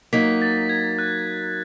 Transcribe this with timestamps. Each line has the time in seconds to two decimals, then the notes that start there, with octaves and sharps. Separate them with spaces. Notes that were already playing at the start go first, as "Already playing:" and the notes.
0.13 F#3 A#3 D#4 B6
0.42 A6
0.69 G#6
0.98 F#6